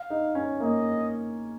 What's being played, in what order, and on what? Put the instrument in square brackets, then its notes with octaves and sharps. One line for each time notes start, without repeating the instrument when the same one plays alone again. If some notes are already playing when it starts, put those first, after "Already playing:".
Already playing: [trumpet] F5
[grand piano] D#4
C#4
[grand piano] A#3 [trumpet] D#5